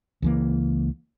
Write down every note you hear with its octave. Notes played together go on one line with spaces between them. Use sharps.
C#2 E3 A#3